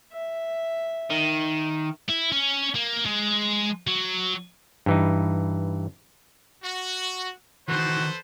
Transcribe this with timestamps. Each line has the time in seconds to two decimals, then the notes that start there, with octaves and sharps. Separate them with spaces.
0.13 E5
1.10 D#3
2.09 E4
2.32 C#4
2.75 A#3
3.05 G#3
3.87 F#3
4.86 G2 E3 D#4
6.64 F#4
7.68 D#3 E3 F#4 A4 B4 C5